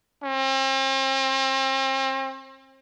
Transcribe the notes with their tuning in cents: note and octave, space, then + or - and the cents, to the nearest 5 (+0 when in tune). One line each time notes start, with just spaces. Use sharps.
C4 +40